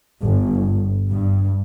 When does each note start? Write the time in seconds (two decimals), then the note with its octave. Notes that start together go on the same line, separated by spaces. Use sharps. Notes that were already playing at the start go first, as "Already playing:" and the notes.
0.22 G1
1.09 G2